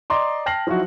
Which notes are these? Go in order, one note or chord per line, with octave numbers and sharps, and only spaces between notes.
D5 D#5 A#5 C6 D6
G5 A5 F6 A#6 C7 F#7
F3 F#3 D#4 E4 F#4